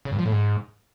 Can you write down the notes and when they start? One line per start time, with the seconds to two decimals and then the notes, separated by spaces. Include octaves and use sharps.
0.05 C#3
0.12 G2
0.19 F3
0.25 A2
0.32 G#2